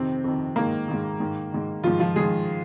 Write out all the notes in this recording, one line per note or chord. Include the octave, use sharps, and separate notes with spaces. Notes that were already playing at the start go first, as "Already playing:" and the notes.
Already playing: F2 C3 D#3 C4
F2 D#3
G#2 D#3 A#3
G#2 D#3
G#2 D#3
G#2 D#3
G#2 D#3 F3 F4
F3 F4
G#2 D#3 G#3 G#4